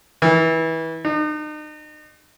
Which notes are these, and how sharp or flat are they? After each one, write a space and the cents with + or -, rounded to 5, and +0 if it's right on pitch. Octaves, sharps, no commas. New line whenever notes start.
E3 -25
D#4 -40